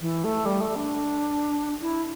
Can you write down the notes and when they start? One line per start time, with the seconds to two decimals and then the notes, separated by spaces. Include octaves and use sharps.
0.01 E3
0.24 A3
0.45 G3
0.61 A3
0.76 D4
1.81 E4